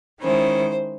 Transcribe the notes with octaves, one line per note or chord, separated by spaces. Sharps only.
D#3 G#3 C#4 E4 C5